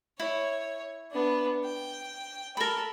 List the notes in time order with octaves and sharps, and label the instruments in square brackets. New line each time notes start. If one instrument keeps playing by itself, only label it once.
[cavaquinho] E4 [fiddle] C#5
[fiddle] B3 D4
G5
[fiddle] A4 [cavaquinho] A#4 B5